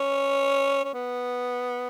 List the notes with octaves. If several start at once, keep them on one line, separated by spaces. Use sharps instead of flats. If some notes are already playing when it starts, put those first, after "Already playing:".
Already playing: C#4
C#4
B3